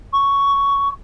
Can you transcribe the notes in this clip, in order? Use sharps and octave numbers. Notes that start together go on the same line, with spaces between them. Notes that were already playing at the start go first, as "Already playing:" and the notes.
C#6